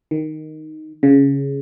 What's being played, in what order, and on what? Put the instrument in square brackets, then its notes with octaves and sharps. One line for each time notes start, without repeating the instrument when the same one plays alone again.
[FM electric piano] D#3
C#3